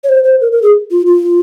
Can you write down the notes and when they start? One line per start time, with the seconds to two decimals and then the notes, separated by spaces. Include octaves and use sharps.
0.04 C#5
0.09 C5
0.24 C5
0.41 A#4
0.52 A#4
0.63 G#4
0.91 F4
1.06 F4